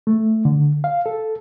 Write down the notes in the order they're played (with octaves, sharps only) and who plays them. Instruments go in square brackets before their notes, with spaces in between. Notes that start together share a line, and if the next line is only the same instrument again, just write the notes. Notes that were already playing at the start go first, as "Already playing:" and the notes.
[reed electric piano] A3
D3
F5
A4